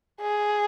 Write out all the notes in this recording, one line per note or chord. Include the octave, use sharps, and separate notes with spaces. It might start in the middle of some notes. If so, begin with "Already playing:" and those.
G#4